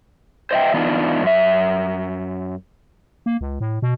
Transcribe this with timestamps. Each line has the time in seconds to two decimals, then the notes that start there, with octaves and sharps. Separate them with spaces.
0.51 C5 D#5 E5 G5
0.74 E3 B3 D4 D#4 F4
1.22 F#2 E5
3.26 A#3
3.41 C#2
3.61 A2
3.82 B2